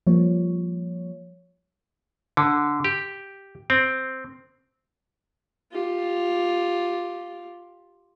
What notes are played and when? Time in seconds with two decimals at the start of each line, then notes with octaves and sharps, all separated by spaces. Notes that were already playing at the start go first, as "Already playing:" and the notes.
0.07 F3 G3 A#3 C#5
2.37 D3
2.84 G4
3.70 C4
5.72 F4 G4